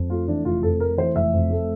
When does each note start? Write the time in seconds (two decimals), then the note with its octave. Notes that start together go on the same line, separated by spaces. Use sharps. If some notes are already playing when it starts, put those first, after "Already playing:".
Already playing: F2
0.10 A3 F4
0.28 E3 D4
0.45 F1 F4
0.63 F2 A4
0.80 A3 A#4
0.98 E3 C5
1.15 F1 E5
1.33 F2
1.50 A3